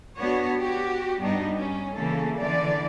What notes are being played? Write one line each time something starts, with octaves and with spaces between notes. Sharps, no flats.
B3 D4 F#4 C#5
F#4 G4
G2 G3 B3 D4 D#4
C#4
C#3 E3 A#3 A4
D3 E3 D5